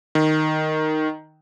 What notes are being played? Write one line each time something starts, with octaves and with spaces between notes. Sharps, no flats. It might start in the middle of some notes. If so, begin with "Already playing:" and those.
D#3